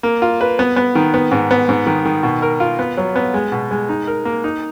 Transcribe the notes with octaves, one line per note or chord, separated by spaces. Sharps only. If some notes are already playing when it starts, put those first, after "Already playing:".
A#3
F4
B4
B3
B3
D#3
B3
G#2
B3
G#2
D#3
D#3
B2
A#4
F4
B3
F#3
B3
G#3
B2
G#3
D#4
A#4
A#3
D#4